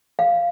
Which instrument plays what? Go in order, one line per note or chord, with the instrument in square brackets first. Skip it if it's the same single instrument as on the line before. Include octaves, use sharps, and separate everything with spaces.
[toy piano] F5